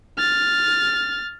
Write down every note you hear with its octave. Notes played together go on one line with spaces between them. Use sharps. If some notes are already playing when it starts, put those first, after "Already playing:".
F6 A6